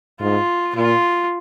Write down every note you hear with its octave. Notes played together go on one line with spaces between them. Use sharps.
G#2 F4
A#2 F4